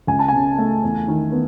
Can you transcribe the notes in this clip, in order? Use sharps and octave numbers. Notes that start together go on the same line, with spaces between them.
C#2 G#5
A5
C#3 G#5
A3
E2
D#3
B3